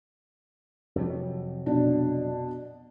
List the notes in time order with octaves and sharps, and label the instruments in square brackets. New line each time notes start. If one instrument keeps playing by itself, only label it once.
[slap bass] F2 C3 F#3
[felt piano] B2 D4